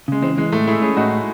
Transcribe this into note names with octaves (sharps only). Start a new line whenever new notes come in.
C#3 G#3
E3 G#3 C4
E3 G#3
A2 A3
A3 E4 G#4
C#4 E4 G#4
A2 D#4 F#4